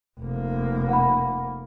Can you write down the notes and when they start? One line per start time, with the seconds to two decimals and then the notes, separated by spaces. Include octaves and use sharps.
0.20 F1 A#3
0.89 F#5 B5